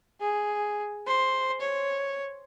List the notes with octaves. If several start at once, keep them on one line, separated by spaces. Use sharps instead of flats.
G#4
C5
C#5